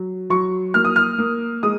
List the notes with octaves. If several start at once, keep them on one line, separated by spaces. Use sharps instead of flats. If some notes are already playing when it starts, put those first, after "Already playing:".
Already playing: F#3
F#3 C#6
A#3 F6
D#6
F6
A#3
G#3 D#6